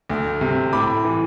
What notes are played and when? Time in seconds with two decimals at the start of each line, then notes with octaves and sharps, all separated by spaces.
0.10 D2
0.41 C3
0.73 A2 B5 D6
1.04 E3